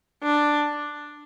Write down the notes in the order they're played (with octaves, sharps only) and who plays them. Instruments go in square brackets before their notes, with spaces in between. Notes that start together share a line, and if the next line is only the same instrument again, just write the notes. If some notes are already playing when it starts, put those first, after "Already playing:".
[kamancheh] D4